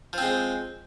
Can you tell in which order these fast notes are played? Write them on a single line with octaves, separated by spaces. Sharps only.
F3 C4 G#3